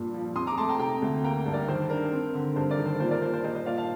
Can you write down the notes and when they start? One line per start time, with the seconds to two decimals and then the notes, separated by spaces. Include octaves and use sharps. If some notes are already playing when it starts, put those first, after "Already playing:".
Already playing: G2 A#2
0.14 F3
0.36 F2 C6 D#6
0.47 A#5 D6
0.57 A3 A5 C6
0.69 G5 A#5
0.79 C3 G5 A#5
1.02 D2
1.24 A#3 G5 A#5
1.46 G2
1.53 A#4 D5
1.68 D#3 C5
1.90 D4 A#4
2.13 C4
2.34 D3
2.56 G2 C5
2.71 A#4 D5
2.79 D#3
2.86 C5
3.00 A#2 C5
3.11 A#4 D5
3.22 A#2 C5
3.33 C5
3.44 G3 C5 D#5
3.55 C5 D#5
3.66 A#2 D5 F5
3.78 F5 A5